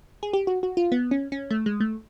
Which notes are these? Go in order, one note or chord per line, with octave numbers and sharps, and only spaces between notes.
G#4
G4
F#4
F#4
F4
B3
C#4
C#4
A3
G#3
A3